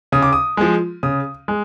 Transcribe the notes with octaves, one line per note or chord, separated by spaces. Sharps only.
C#3 D#6
D6
D#6
F3 G#3
C#3 D#6
G#3